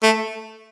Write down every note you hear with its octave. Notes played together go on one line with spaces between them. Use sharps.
A3